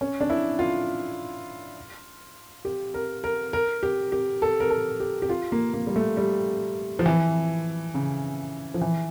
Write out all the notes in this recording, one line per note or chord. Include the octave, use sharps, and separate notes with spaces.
C#4
D4
E4
F4
G4
A#4
A#4
A#4
G4
G4
A4
A#4
A4
G4
G4
F4
A#3
A#3
G3
A3
G3
F3
E3
C#3
F3
E3